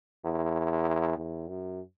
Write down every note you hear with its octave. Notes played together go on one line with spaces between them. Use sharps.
E2
E2
F#2